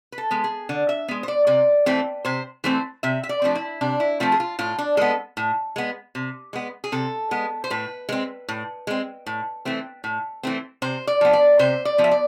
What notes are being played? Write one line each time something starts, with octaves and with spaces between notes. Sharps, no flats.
B4
A4
G#3 B3
G#4
D3
E5
G#3 B3
C5
D5
C3 D5
E3 A3 C4
C3 C5
E3 A3 C4 C5
C3 E5
E5
D5
F3 A3 C4 D4
E4
C3 D4
E4
F3 A3 C4 F4
G#4
F4
A2 F4
D4
G#3 B3 A4
A2
G#3 B3
C3
G#3 B3
G#4
C3 A4
G#3 B3
C5
A2 B4
G#3 C4
A2
G#3 C4
A2
E3 A3 C4
A2
E3 A3 C4
C3 C5
D5
F3 B3
D5
C3 C5
D5
F3 B3
E5
D5